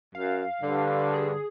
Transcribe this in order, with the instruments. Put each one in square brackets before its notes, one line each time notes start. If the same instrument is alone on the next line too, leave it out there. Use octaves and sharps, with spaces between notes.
[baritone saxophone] F#2 [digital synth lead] F5
[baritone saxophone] G2 [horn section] D3
[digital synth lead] G#4